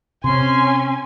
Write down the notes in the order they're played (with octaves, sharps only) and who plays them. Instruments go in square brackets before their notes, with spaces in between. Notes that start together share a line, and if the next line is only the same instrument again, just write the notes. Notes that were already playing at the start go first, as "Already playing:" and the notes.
[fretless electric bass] C3 [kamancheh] C#4 G#5 [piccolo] C6